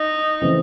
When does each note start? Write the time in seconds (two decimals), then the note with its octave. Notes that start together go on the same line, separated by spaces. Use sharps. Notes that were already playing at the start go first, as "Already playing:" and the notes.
Already playing: D#4
0.41 C#3 E3 A3 C4